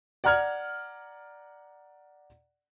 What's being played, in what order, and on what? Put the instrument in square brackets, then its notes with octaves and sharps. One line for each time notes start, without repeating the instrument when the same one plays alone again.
[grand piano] D5 F#5 A#5 F6 G#6